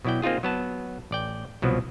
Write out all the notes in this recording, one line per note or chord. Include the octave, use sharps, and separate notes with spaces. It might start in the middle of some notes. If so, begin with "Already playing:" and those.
B2 F#3 E4 D5 G5
A#3 C4 D#4 F4 G#4
F#3 B3 A5
A1 D5 G5
C2 B2 F3 F#3